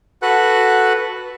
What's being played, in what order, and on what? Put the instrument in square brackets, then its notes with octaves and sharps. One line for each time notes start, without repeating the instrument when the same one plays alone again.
[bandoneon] F#4 A4 B4 F#5 F#6